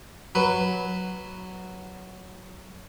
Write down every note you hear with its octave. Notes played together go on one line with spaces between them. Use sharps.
F#3 B4